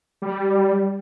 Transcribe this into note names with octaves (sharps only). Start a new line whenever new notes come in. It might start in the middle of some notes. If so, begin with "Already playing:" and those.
G3